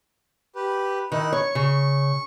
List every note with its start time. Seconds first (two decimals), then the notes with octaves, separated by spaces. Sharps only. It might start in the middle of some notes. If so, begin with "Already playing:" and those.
0.56 G4 B4
1.12 D#3 D#4 E4 F#6
1.32 C#5 C#6
1.55 C#3